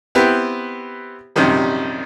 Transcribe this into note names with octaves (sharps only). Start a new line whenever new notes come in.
B3 C4 E4 G4 B4
A#1 F#2 C3 D#3 G3